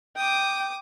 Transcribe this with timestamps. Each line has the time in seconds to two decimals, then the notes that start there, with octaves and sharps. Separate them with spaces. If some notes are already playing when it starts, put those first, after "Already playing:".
0.17 G5 D6 D#6